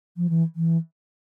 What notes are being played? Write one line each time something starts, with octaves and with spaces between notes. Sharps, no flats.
F3
E3
E3